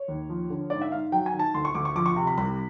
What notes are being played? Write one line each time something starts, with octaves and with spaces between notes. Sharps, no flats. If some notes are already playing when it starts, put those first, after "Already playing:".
Already playing: C#5
D#2
F3
D3
G#2 D5
E5
G#2 F5
F#3 G5
G#5
D#3
A5
D2 C6
C#6
D2 D6
C#6
F3 D6
C#6
C3
B5
C2 B5